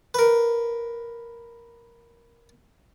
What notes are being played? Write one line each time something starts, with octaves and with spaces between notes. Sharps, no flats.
A#4 B4